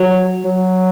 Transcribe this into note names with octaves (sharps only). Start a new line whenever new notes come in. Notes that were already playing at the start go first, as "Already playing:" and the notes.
Already playing: F#3
F#3